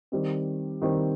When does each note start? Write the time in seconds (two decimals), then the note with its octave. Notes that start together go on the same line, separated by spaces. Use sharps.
0.12 D#3 G3 C4
0.82 D#3 G3 C4